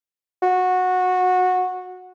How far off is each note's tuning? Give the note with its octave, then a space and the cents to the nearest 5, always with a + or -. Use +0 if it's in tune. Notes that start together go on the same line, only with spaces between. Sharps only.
F#4 -15